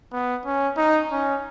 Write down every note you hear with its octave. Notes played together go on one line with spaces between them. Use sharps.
B3
C#4
D#4
C#4